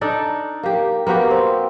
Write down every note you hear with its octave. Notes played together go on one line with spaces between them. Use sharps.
D4 D#4 A4 D5
A#3 G4
A#3 B3 F#4 G4
C4